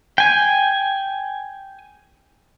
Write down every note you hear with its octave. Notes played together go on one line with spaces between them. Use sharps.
G5 G#5